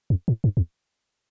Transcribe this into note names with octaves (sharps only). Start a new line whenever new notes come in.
F2
A2
G2
E2